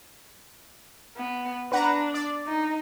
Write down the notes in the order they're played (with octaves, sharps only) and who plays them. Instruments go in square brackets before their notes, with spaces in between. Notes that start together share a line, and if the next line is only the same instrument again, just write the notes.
[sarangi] B3
[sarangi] D4 [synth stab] B4 F#5 A#5
[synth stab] D5
[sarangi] D#4